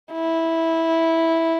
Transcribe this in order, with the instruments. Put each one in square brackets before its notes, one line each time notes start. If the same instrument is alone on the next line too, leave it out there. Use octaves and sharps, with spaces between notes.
[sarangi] E4